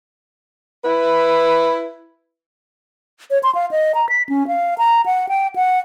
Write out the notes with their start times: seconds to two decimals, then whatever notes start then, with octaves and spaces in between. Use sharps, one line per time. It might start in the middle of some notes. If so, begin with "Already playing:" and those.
0.85 E4 B4
3.31 C#5
3.43 C6
3.55 F5
3.71 D#5
3.95 A#5
4.09 B6
4.29 C#4
4.48 F5
4.78 A#5
5.06 F#5
5.29 G5
5.56 F#5